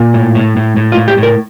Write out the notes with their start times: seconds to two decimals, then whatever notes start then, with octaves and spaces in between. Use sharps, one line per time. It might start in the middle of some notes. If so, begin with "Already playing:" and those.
Already playing: A#2
0.14 A2
0.35 A2
0.57 A2
0.77 A2
0.92 F4
0.97 A2
1.08 G4
1.18 A2 A#4